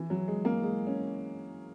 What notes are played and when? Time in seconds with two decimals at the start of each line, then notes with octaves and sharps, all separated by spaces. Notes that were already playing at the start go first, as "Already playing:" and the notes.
Already playing: E3
0.10 F#3
0.28 G#3
0.45 A#3
0.63 G#3
0.87 C#4